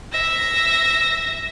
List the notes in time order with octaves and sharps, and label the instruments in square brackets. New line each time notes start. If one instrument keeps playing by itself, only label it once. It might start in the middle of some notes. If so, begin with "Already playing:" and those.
[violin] E5 A#6